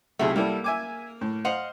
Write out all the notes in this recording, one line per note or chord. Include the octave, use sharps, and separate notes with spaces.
B1 C3 A3 E4 G#4
G3 A#3 E4 A4
E5 G#5 D6
A2
C5 D#5 F5 F#5